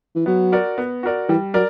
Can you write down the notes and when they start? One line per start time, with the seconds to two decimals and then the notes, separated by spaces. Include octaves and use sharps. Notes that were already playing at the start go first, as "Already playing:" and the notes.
0.15 E3
0.26 F#3 B3
0.52 F#4 A#4 D5
0.78 B3
1.03 F#4 A#4 D5
1.29 E3 G3
1.54 F#3 A#4 D5